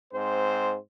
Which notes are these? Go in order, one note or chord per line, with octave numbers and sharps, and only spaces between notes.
G#2 C4 C5